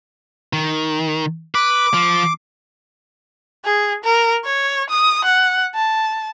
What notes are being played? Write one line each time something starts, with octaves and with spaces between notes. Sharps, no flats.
D#3
B4 D6
F3
G#4
A#4
C#5
D#6
F#5
A5